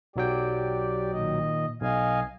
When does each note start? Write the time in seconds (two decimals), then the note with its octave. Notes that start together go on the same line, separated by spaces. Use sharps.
0.16 B1 F#3 G4 D5 G5
1.12 A#2 D#3 D#5
1.81 B1 D#5 F5 G#5